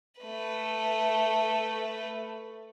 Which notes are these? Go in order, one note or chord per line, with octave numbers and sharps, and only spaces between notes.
A3 B4